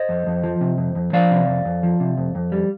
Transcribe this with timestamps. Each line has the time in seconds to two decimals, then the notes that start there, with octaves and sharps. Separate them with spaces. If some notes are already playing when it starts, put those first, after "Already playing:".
Already playing: C5 D#5
0.09 F2
0.27 F2
0.44 F3
0.61 C3
0.78 F2
0.95 F2
1.13 F3 D5 F5
1.31 C3
1.48 F2
1.65 F2
1.83 F3
2.00 C3
2.17 F2
2.35 F2
2.52 G3